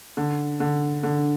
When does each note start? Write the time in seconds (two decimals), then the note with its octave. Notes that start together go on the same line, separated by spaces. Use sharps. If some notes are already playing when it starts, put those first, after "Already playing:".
0.17 D3
0.60 D3
1.03 D3